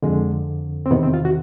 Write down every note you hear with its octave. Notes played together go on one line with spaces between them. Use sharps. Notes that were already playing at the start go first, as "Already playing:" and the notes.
F2 D3 G#3
C4
E2 C3 D#3 B3
C4
F4
F#4